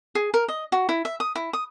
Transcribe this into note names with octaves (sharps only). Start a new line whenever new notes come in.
G#4
A#4
D#5
F#4
E4
E5
D#6
E4
D#6